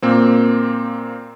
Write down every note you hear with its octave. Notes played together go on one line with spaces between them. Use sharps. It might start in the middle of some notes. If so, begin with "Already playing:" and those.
A#2 A#3 C4